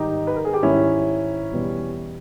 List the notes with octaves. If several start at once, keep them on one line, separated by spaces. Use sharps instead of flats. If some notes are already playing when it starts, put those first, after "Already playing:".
Already playing: G#2 D#3 G3 D#4 G4
B4
A#4
G#4
G4
G#2 D#3 G3 C#4 E4
E2 B2 G3